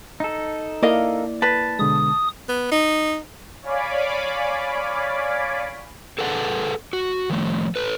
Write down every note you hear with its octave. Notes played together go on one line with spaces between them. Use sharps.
D#4 A4
A#3 E4 A#4 D5 D#5 F5
B4 A5
B2 D3 G#3 D#6
B3
D#4
C#5 D5 F5 G#5 B5 D6
G#4 A4 B4 F#5 G5 A5
F#4
D#3 F3 A3
A4 B4